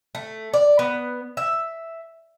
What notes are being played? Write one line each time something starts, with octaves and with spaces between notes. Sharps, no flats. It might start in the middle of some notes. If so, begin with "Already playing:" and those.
A3
D5
B3
E5